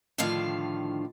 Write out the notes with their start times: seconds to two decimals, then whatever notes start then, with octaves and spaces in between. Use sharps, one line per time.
0.18 A2 D3 D#3 F3 D4 F5